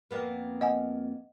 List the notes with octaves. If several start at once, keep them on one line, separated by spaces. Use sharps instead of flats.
F2 A#3 B3
D#5 F#5 G#5